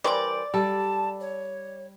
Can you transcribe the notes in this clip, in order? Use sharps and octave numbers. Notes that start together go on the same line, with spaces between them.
E3 G3 A#4 C5 D5 D6
G3 A4 A5
C#5